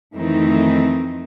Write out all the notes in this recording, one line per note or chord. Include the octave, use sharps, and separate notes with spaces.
F2 D#3 E3 A3 C4 D#4